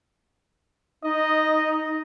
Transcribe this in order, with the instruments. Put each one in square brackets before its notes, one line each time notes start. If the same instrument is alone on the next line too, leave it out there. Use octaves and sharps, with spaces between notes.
[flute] D#4 [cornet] D#5